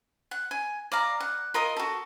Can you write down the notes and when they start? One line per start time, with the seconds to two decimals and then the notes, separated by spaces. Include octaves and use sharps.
0.31 F#5
0.51 G#5
0.92 D5 F5 A#5
1.20 F#5
1.54 F4 A#4 D#5 D#6
1.77 F#4 A4